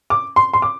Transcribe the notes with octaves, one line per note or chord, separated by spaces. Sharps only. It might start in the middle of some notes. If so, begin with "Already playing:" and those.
D6
C6
C6
D6